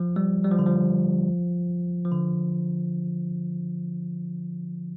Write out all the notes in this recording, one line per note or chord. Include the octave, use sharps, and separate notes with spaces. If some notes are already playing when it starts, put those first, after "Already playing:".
Already playing: F3
G3
G3
F3
D3
F3
F3
D3